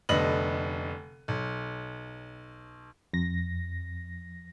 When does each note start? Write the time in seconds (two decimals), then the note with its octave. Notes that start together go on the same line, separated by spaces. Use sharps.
0.09 F1 D3 B3 D#5 F#7
1.28 B1
3.13 F2 A#6